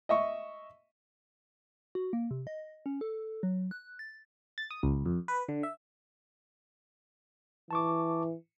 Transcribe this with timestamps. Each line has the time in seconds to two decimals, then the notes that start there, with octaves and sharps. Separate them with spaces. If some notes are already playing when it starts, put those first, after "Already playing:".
0.09 D#5 E5 C#6
1.95 F#4
2.13 A#3
2.31 C3
2.47 D#5
2.86 C#4
3.01 A4
3.43 F#3
3.71 F#6
3.99 A6
4.58 A6
4.71 D#6
4.83 C#2
5.06 F2
5.28 B4
5.49 D3
5.63 E5
7.71 E3 A5 C#6 D6